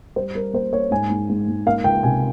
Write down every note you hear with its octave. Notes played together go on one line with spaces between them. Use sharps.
G3 C5
G3 A#4
A#3 C5
A#3 C#5
G#2 G#5
G#2
G#2
G#2
A#3 F5
C#2 G5
C3 G#5